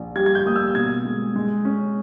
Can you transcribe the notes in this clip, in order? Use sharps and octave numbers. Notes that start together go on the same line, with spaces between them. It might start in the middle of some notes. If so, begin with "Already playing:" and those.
Already playing: A#1
G3 G#6
G#6
G6
A#3 D#6
E6
B2 G#6
G#3
G#3
C#4